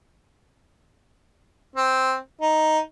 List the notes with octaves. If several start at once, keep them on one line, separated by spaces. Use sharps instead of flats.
C4
D#4